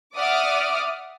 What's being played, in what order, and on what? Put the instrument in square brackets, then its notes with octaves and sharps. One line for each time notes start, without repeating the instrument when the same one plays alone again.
[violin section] D5 E5 F#5 D6 D#6 F6